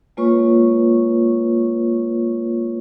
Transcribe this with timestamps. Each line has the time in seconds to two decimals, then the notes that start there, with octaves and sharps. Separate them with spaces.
0.17 G#3 A#3 F4 B4 C#5 C#6